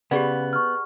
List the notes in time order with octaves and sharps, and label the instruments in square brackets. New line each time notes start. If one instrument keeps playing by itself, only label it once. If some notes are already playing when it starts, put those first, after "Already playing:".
[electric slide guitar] C#3 [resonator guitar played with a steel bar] B3 [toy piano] G4 G#4 D5
[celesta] C#6 F6